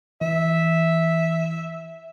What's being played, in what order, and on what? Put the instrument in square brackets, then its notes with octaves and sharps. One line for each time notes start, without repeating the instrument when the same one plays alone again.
[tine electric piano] E3 [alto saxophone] E5